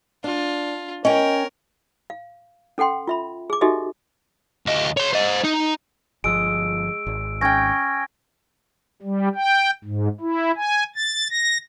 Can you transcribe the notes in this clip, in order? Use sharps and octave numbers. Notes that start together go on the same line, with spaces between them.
D4 F4
C#4 A#4 D#5 G5
F5
C#4 A4 F#5 G5 C6
F4 E5 B5
G#4 D6
D#4 F#4 G4 A4 D#5 E5
D2 D#5
C#5 C6
C5 D#5
D#4
G1 F3 G#3 E6 D7
G#1
C#4 G5 G#5 G#6 A#6
G3
G5
G#2
E4
G#5
A6
A#6